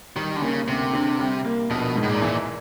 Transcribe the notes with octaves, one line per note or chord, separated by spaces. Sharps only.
D#3 G3
D3
C#3 A#3
D2 C3
D3
G3
A#3
A#1 B2
G#2
A2
A#2
E3